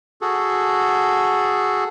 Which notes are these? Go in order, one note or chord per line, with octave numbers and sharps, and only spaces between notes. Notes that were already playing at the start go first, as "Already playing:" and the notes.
F#4 G#4 A4